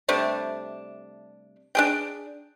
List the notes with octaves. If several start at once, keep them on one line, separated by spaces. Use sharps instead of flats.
C3 G3 A3 D4
D4 G#4 G5